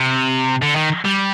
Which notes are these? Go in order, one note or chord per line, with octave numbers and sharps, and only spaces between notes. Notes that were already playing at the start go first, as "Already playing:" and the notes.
Already playing: C3
D3
D#3
G3